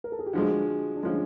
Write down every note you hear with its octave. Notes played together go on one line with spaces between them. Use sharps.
A#4
A4
G#4
G4
D3 F3 G#3 F#4
D4
D3 F3 G#3 C#4